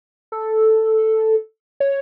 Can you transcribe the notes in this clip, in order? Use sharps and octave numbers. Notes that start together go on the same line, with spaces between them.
A4
C#5